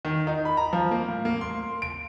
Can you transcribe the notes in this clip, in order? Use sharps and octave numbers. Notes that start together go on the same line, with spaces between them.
D#3
D#4
B5
A#5
F3
A#3
A2
A#3
C6
D7